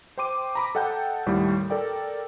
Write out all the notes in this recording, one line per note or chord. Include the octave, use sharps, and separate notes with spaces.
C5 G5 C6 D6 D#7
A#5 B5 D6
A4 D#5 F#5 G5 A5 G6
D#2 A2 G3
A4 A#4 D5 G5